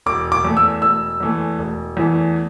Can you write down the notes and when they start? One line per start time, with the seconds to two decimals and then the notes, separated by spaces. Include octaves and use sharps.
0.06 E1 D6
0.32 D6
0.45 E2 E3 A3
0.57 E6
0.82 E1 E6
1.20 E2 E3 A3
1.59 E1
1.97 E2 E3 A3